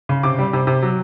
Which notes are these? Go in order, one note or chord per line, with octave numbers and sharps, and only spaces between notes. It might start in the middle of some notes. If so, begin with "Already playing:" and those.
C#3
C3 D6
G3
C3
C3
F#3